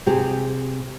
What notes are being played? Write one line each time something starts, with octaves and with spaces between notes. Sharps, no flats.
C3 G4 G#4